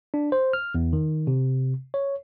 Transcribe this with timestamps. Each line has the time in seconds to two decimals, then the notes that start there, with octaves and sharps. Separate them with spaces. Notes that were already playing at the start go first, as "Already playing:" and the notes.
0.14 D4
0.32 C5
0.53 F6
0.75 E2
0.93 D#3
1.27 C3
1.94 C#5